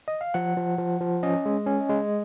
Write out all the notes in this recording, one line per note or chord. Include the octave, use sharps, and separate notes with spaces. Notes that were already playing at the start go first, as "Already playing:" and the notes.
D#5
F5
F3 F#5
F3
F3
F3
C#4 D#5
G#3
C#4
G#3